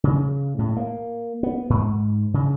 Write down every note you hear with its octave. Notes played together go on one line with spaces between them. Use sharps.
C#3
A2
A#3
B3
G#2
C#3